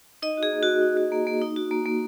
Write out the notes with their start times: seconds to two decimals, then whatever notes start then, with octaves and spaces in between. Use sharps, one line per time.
0.22 D#4 D#5
0.37 F#4
0.43 G#4
0.52 A#3
0.63 A#3 F#4
0.82 D#4
0.97 F#4
1.12 A#3
1.27 A#3
1.41 D#4
1.56 F#4
1.71 A#3
1.86 A#3